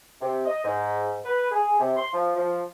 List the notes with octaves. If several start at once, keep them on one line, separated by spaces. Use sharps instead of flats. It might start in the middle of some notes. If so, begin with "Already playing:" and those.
C3
D#5
G#2
B4
G#4
C3
C6
F3
F3